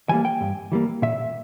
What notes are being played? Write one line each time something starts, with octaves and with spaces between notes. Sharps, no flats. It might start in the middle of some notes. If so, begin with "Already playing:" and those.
E3 G3 A#3 G#5
G5
G2
E3 G3 A#3
A#2 E5